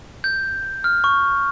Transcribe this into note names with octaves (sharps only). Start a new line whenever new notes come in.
G6
F6
C#6